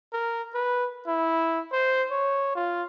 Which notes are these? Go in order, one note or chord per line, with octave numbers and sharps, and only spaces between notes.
A#4
B4
E4
C5
C#5
F4